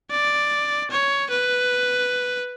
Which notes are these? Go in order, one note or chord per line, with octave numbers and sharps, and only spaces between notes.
D5
C#5
B4